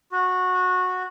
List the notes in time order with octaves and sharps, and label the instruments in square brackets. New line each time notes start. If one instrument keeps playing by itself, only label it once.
[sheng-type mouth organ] F#4